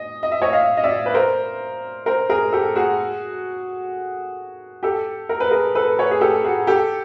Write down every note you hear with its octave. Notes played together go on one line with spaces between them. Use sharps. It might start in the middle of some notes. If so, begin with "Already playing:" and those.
Already playing: D#5
D#5
E5
C#5 D#5
D#5 F5
D#5
D5 E5
B4
A#4 C5
A#4 C5
G#4 A#4
G4 A4
F#4 G#4
G4 A4
A#4
B4
G#4 A#4
A4 B4
B4 C#5
G#4
G4 A4
F#4 G#4
G4 A4